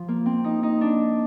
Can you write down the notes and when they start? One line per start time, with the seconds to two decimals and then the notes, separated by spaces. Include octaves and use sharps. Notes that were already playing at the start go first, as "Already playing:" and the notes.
Already playing: F3
0.08 A#3
0.26 C4
0.44 D#4
0.63 D#4
0.81 D4